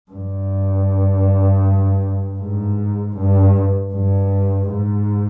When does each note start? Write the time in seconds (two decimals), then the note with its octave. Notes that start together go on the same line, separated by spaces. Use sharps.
0.11 G2
2.40 G#2
3.16 G2
3.93 G2
4.69 G#2